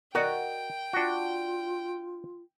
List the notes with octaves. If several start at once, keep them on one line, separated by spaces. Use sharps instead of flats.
F#4 A#4 D5 D#5 G5
D4 F4 F#4